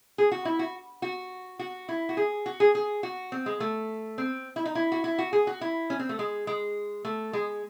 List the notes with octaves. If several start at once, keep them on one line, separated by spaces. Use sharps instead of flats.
G#4
F#4
E4
F#4
F#4
F#4
E4
F#4
G#4
F#4
G#4
G#4
F#4
C4
G#3
A3
C4
E4
D#4
E4
F#4
E4
F#4
G#4
F#4
E4
C#4
C4
A3
G#3
G#3
A3
G#3